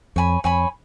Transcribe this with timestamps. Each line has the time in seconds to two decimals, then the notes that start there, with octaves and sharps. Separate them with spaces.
0.16 F2 C#5 G#5 B5
0.44 F2 C#5 G#5 B5